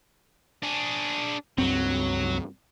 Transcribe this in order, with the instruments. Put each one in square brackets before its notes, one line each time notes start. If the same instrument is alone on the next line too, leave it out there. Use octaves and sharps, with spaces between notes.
[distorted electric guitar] D4 G#4
[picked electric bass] C#2 G2 C4 [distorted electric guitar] F#3